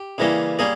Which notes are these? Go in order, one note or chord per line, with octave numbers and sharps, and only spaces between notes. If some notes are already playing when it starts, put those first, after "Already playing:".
Already playing: G4
C#3 E3 G3 A#3 C#4
G3 A#3 C#4 G#4